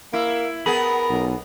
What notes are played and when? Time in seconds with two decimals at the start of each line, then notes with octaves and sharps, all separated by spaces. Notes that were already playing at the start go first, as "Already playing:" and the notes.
0.13 A#3 E4
0.66 B3 G#4 A#4 B5
1.09 B1